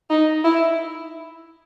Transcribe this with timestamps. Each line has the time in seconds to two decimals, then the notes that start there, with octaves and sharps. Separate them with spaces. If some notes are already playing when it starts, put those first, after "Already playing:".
0.10 D#4
0.44 E4